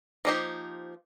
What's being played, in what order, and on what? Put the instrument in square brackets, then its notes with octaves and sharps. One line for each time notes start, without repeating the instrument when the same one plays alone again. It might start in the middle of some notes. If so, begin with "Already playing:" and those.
[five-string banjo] F3 A#3 D#4 G4 C5